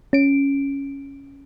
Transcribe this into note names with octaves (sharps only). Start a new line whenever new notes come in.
C#4 D7